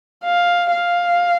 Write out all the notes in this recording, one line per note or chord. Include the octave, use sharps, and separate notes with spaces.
F5
F5